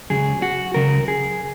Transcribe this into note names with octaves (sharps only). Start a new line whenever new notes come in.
C#2 C#3 F#3 G#4
F#4
C#2 C#3 F#3 A#4
G#4